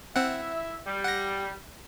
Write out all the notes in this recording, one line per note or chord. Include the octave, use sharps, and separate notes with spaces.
C4 E4 E5 F#5
G3
F#5 A#6